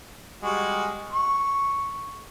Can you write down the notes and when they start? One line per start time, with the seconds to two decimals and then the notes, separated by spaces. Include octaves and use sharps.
0.43 G3 G#3 F#4
1.13 C#6